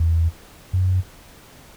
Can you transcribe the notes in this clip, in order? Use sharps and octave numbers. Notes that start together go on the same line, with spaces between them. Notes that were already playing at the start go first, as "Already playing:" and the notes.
Already playing: E2
F#2